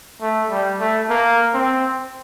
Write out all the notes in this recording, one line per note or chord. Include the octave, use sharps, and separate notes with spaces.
A3
G3
A3
A#3
C4